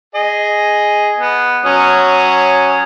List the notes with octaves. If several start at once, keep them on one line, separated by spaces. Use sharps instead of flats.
G#4 D#5
B3
F#3 C#4 D#6